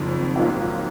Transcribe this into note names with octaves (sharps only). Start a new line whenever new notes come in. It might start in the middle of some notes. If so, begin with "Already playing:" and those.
Already playing: F#1 F2 D#3
A#1 G#2 F#3 A#3 F4